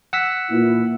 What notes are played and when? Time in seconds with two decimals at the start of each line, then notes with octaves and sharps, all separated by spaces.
0.13 F#5 E6 B6
0.50 A#2 E3 E4